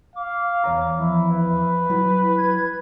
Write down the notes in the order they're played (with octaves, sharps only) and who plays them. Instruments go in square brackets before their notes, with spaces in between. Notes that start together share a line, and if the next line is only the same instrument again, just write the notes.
[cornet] F5 [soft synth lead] D6
[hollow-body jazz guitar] E2 C#5 A#5
[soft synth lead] F3 [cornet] E4
[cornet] B4
[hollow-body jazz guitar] F#3 [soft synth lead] E4
[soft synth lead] G#6